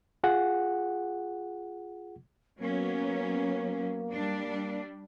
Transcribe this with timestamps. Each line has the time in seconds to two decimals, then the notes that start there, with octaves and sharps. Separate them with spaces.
0.24 F4 G#4 F#5
2.59 F#3 A#3 B3 C#4
4.11 G3 D4